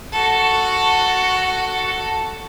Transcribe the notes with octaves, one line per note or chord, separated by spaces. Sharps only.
F#4 A4